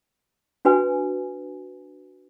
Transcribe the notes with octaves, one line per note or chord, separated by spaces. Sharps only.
D4 F#4 B4 G#5